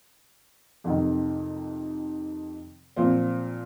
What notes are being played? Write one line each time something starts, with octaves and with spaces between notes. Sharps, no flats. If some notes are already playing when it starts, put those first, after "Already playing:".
F2 C3 D#3
A#2 F3 C4